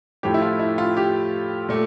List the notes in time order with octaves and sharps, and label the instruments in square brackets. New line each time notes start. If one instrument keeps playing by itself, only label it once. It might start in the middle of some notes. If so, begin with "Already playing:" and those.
[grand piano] A2 F3 A3 G4
E4
F4
E4
F4
G4
A#2 A3